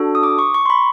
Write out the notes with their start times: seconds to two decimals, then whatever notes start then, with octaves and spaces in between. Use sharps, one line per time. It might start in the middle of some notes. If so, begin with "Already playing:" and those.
Already playing: D4 F#4 A4
0.15 D#6
0.23 D6
0.39 C#6
0.54 C#6
0.66 C6
0.70 B5